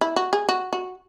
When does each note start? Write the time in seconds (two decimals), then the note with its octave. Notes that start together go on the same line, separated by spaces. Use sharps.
0.01 E4
0.16 F#4
0.33 G#4
0.49 F#4
0.73 F#4